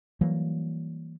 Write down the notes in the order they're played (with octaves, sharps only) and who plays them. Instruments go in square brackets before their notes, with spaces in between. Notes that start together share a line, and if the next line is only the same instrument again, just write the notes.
[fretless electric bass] E3 F#3 G3 A#3